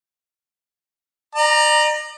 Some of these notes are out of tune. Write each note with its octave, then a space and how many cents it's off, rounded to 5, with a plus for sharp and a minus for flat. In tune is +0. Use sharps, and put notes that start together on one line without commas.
D5 +40 A#5 +5